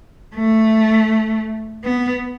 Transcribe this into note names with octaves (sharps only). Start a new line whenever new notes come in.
A3
B3